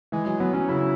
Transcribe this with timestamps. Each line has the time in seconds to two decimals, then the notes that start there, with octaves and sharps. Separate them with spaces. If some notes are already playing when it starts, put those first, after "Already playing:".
0.12 E3 G#3
0.26 F#3 G#3
0.40 F#3 B3
0.54 F#3 C#4
0.69 C#3 E4